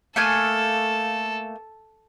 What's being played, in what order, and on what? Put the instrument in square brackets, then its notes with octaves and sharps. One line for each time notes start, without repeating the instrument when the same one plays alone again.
[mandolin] A3 A#3 G#5 [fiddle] A4